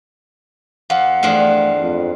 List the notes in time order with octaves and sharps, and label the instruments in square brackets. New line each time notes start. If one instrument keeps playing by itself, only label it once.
[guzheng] F2 [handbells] F5 F#5
[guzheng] E2 G2 F3 [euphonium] A3
[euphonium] F2